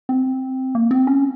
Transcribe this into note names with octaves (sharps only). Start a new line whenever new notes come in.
C4
A#3
C4
C#4